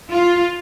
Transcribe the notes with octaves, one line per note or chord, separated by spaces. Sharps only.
F4